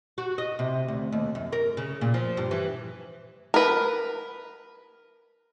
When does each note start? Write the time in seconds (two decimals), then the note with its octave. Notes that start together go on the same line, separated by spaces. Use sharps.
0.18 F#4
0.38 D#5
0.59 C3
0.88 D2
1.12 D#2
1.35 F#2
1.52 A#4
1.77 C#3
2.01 A#2
2.14 F3
2.37 G2
2.51 E3
3.54 A#4 B4